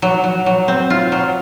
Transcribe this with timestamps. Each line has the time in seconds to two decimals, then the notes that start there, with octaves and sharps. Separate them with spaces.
0.02 F#3
0.24 F#3
0.46 F#3
0.68 C4
0.90 F4
1.12 F#3